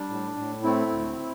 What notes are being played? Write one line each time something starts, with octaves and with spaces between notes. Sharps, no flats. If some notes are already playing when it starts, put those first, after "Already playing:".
Already playing: G3 D4
A2
A2
A3 C4 E4
D2